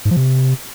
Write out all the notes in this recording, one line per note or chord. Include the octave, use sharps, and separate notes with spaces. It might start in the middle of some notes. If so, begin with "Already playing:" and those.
G#2
F3
C3